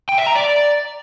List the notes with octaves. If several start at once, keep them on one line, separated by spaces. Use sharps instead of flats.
G5
E5
A#5
D5